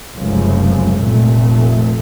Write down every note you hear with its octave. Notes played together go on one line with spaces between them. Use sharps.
F1 C#2 F#2 F3
F1 A#2 A3